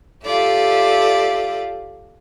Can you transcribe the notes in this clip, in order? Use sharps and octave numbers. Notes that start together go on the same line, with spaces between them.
F4 G4 A4 D5 E5